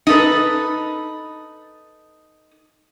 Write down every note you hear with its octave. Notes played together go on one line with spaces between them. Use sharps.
D#4 A4 B4